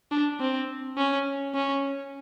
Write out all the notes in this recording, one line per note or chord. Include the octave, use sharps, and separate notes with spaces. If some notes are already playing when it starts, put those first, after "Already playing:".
D4
C4
C#4
C#4